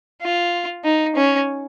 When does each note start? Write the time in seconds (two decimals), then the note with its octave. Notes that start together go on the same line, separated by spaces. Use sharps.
0.22 F4
0.84 D#4
1.16 C#4